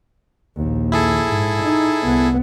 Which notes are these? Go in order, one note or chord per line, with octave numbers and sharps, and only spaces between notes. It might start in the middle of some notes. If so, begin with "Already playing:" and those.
A#1 D#2
E4 G#4 A4
G#2
D#4
C2 B3